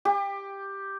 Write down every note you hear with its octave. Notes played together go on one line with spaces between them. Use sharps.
G4